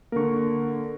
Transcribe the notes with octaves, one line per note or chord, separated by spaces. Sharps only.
D3 A#3 A#4 C#6